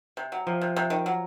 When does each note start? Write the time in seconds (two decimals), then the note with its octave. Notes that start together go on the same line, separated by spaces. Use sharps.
0.17 C3
0.32 F#3
0.47 C3 F3
0.61 C3
0.76 C3
0.90 D#3
1.06 F#3